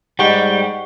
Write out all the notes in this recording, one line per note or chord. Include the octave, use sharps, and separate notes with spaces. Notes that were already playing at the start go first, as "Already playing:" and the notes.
G#2 G3 G4 C5 D#5 F#5 G5 C#6